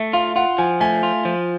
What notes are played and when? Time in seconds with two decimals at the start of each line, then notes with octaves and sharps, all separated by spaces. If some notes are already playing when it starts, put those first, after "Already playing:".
Already playing: A3 E5
0.13 F4 F5
0.36 F4 F#5
0.58 F3 G#5
0.81 A3 G#5
1.03 F4
1.25 F3